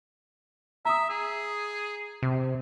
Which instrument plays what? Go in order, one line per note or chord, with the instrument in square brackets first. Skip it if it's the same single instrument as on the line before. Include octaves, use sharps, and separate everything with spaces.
[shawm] E5 [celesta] A#5 D#6
[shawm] G#4
[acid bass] C3